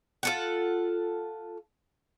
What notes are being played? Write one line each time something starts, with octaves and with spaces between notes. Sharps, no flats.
F4 A4 F#5